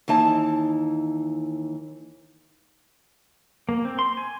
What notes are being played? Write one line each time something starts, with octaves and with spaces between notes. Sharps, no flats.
D#2 E3 D#4 A5
A#3
C4
C6
G#5